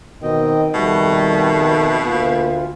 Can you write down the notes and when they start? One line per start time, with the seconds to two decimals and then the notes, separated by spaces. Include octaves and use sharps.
0.23 B2 D#3 C4 D#5 G5
0.74 F2 B2 D#3 G3 A3 F#5
2.07 D2 A#3 F4